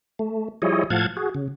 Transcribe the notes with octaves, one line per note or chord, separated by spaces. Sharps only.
A3
F3 G3 E4 G#4 C#5 D#5
A2 F3 F5 F#5 A5 G#6
F#4 G#4
C#3